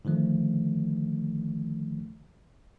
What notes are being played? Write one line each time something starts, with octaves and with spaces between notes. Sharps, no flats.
D3 D#3 F3 A3